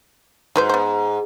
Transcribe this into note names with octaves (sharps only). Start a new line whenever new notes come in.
G#2 F#3 B4 C5
B3 C5